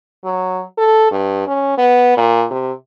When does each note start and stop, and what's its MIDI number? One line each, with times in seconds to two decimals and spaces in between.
0.24 0.62 54
0.77 1.08 69
1.11 1.43 43
1.47 1.73 61
1.78 2.15 59
2.17 2.45 46
2.50 2.71 48